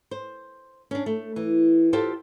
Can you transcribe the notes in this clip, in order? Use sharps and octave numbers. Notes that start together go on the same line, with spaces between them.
C5
C#4 D4
A3
E3
F4 G4 A4 C5